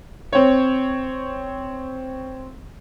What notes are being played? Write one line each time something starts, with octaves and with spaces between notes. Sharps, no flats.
C4 C#5